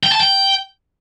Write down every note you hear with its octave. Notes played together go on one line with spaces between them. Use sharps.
G5
A5
G5